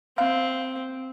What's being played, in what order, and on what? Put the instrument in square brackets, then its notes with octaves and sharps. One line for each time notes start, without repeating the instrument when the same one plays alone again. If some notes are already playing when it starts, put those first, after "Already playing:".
[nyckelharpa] C4 [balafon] F5